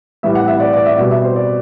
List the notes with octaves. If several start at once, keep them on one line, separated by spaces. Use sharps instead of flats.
A2 E3 G3 E5
F#5
E5
D5
D5
E5
B2 G3
E5
C5
D5